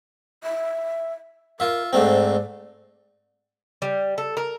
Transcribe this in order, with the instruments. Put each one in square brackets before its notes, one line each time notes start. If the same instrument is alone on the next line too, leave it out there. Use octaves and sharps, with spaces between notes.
[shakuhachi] E5
[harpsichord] F4 E5 [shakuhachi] A#4
[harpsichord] G#2 A3 C4 [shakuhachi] D5
[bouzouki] G3
A4
A#4